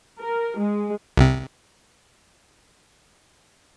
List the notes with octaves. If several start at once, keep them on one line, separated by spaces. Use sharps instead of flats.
A#4
G#3
C2 C3